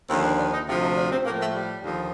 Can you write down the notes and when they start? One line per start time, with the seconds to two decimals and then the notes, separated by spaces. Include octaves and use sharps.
0.09 D#2 D3 F3 C4
0.24 D4
0.38 D4
0.53 D#4
0.67 D2 C3 F3 F4
0.82 D#4
0.96 D4
1.11 C4
1.25 A2 F3 A#3
1.40 A3
1.54 G3
1.83 D#2 D3 F3